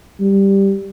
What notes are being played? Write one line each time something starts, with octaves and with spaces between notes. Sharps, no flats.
G3